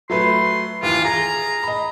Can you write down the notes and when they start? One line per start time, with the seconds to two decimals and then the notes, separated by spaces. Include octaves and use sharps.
0.10 F#3 A3 B4 C6
0.83 D#2 E3 F4
1.05 G#4 A#5
1.63 D#5 B5